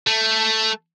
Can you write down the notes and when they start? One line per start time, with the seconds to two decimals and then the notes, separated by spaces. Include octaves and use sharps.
0.07 A3